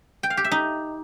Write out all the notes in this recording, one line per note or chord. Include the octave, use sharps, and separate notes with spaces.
G5
F5
G4
E5
D#4